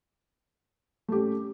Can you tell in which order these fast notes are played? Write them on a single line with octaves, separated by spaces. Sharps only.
A3 G4 C#4